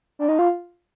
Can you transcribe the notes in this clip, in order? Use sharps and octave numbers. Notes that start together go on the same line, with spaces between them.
D4
D#4
F4